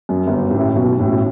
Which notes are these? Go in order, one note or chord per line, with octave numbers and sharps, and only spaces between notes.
F#2
G1 G2
A1 A2
B1 B2
A1 A2